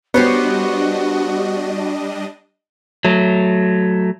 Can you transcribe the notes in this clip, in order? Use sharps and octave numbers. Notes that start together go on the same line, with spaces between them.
G3 B3 D4 F#4 G4 C5 C#5 D#5
F#3 A3